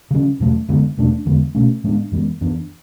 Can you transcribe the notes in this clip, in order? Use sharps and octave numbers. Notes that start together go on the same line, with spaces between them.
C#3 F#3 C#4
E2 B2 F#3 A3
F#2 D3 G#3 B3
E2 B2 A3 D4
E2 D3 G#3 B3
B2 A3 C#4
A2 G#3 B3 D4
F#2 E3 G#3 B3
F#2 E3 B3 D4